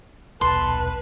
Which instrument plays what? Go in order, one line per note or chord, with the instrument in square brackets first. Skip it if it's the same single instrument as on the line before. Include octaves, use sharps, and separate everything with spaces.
[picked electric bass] D#1 B1 [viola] B4 [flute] A5 [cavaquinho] C6